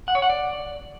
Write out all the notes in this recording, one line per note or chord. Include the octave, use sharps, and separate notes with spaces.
F#5
C#5
F#5
D5